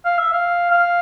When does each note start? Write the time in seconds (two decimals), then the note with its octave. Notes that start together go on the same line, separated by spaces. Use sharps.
0.05 F5
0.18 E5
0.33 F5
0.70 F5